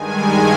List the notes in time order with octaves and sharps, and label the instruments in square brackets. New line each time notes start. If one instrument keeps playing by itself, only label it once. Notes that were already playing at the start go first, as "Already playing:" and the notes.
Already playing: [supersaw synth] G2 D#3 G#3 G#5